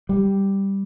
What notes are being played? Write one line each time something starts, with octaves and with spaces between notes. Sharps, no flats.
G3